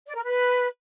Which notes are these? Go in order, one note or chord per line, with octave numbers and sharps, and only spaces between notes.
D5
A#4
B4